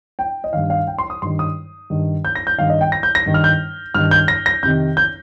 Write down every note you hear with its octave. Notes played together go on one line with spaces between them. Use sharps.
G5
D#5
G2 D#3 F5
F5
G5
C6
D#6
G2 D#3 C6
D#6
G2 D#3
G6
A#6
G6
G2 D#3 F5
D#5
G5
A#6
G6
A#6
G2 D#3
F6
G6
G2 D#3 F6
G6
A#6
A#6
F2 C3 D#3 G6
G6